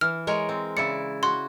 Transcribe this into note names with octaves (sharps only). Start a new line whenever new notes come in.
E3 F6
G#3 A#4 C#5
C4
C#3 E4 D5 C#7
F#4 C6